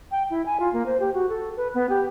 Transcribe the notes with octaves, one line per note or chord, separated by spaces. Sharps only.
G5
E4
G#5
F4
A#3
C5
G4
F#4
A4
B4
B3
G4